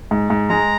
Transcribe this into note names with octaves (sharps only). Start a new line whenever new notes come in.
G#2
G#2
G#3 A#5